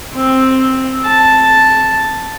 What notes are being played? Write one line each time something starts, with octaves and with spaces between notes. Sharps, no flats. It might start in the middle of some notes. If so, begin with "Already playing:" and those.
C4
A5